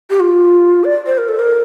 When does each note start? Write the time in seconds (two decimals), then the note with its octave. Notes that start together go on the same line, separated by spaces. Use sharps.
0.10 G4
0.20 F4
0.84 D5
1.06 C5
1.18 A#4
1.28 A4
1.39 A#4